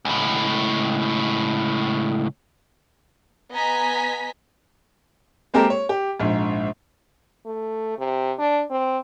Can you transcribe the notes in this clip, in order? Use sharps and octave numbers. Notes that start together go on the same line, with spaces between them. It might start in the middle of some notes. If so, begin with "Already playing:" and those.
C#2 A2
B3 D#5 G#5 A#5 B6
G#3 A#3 C4 G4 A4 A#4
C#5
G4
A#1 G#2
A3
C3
D4
C4